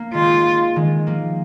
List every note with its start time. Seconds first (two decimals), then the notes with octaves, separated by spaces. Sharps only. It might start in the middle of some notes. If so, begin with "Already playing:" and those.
Already playing: A#3
0.14 D#3 G#3 F4
0.76 D#3 G#3
1.07 F3 A#3